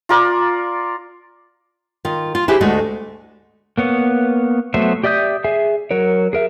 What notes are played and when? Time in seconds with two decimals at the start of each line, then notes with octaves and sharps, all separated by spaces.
0.09 F4 A#4 D5
2.05 D#3 F4
2.35 F4
2.48 E4 G4 G#4 B4 C5
2.61 D2 G#3 A3 F#4
3.78 A#3 B3 C#5
4.74 F#3 A3 B3 C5 E5
5.04 G4 D5 E5 D#6 G6
5.44 G#4 E5 G#5
5.91 F#3 A#4 C#5
6.33 G#4 A#4 E5